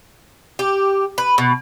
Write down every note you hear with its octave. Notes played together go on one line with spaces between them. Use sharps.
G4
B4
B2